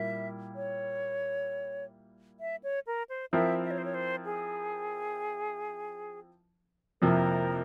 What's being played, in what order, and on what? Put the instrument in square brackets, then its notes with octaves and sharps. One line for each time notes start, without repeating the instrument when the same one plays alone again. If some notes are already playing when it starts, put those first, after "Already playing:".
Already playing: [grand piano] A#2 G3 A#3 E4 [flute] E5
[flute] C#5
E5
C#5
A#4
C5
[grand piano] F3 C4 E4 A#4 [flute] E5
[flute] E5
C#5
C5
C#5
C5
G#4
[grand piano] F2 C3 F3 A#3 E4 [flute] A#4